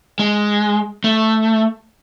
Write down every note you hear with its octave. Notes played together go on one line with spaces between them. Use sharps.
G#3
A3